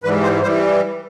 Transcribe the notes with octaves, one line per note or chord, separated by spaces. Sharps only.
G#2 E3 G3 B4
C5
E3 G3 C5